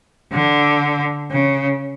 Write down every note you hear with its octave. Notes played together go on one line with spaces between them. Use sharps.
D3
C#3